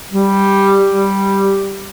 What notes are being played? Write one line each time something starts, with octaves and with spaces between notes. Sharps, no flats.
G3
G3